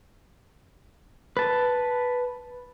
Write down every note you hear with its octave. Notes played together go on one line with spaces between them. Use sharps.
B4 A5